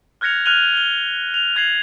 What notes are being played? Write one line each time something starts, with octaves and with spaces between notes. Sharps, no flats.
F6 F#6 G#6 A#6 C#7 F7
F6 F#6 G#6 D#7 F7 G7
F6 G7
F7
F6 G#6 A#6 C7 F7 F#7